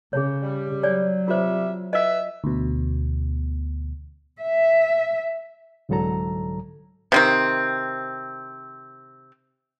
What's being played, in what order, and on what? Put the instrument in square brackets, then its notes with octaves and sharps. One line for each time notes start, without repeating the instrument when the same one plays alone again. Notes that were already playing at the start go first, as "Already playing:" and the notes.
[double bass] C#3 [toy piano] G#4 C#5
[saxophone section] G3
[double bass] F#3 [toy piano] C#5 D5 G#5
[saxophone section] C3 G3 E5 [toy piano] F4 F#4 C5
[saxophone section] B4 E5 [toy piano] D#5 G#5
[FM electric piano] D2 B2
[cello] E5
[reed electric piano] C2 G#2 D3 F#3 A4 A#5
[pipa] C3 D#3 C4